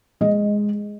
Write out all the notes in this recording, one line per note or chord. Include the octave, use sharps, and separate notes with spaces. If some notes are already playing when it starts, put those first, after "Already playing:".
G#3 D#5